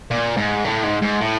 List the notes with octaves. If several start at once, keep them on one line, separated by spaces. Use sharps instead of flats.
A#2
G#2
A2
G#2
G#2
A2